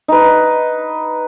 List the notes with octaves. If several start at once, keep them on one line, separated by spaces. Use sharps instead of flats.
D#4 B4